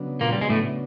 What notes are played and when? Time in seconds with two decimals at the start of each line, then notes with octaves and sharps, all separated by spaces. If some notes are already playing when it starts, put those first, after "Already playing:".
Already playing: C#3 F#3 B3 D4
0.21 A#2 A#3
0.32 G3
0.41 G#3
0.50 A2 A3